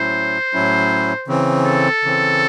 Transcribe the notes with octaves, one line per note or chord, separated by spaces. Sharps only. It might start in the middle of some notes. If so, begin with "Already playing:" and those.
Already playing: A2 F#3 C#4 E4 C5
A2 F#3 C#4 E4
C#3 E3 C4
A4
C#3 E3 C4